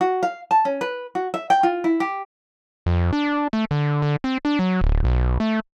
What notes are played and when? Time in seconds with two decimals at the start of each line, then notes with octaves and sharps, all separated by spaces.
0.01 F#4
0.23 F5
0.51 A5
0.65 C#4
0.81 B4
1.15 F#4
1.34 E5
1.50 G5
1.63 F4
1.84 E4
2.00 G4
2.86 F2
3.13 D4
3.53 A3
3.71 D3
4.02 D3
4.24 C4
4.45 D4
4.59 F#3
4.81 D1
5.04 B1
5.40 A3